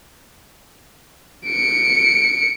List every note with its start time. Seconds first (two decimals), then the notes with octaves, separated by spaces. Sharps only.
1.47 C#7 D7